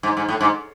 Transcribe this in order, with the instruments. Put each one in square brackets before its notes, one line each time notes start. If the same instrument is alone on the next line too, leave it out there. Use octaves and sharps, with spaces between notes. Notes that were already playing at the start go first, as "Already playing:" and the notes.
[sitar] G#2
G#2
A2
G#2